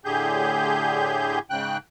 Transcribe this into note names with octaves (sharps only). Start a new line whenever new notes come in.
A2 D3 G4 G#4 G6
G#2 C#3 G5 F#6